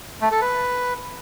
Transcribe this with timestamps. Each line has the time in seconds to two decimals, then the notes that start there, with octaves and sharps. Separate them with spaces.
0.21 A3
0.31 A4
0.41 B4